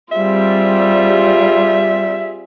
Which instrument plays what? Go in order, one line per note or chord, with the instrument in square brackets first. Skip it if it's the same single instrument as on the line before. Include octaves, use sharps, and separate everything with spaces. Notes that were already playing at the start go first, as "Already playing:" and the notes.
[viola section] G3 C4 [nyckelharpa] F4 G#4 [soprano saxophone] E5